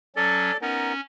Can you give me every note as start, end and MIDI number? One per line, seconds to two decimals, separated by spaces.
0.16 0.51 54
0.16 0.51 61
0.16 0.57 69
0.16 0.57 74
0.61 0.93 59
0.61 1.01 61
0.61 0.93 63
0.61 0.93 70